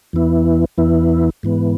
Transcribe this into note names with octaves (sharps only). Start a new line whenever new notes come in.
E2 E3 B3 E4
E2 E3 B3 E4
G#2 E3 B3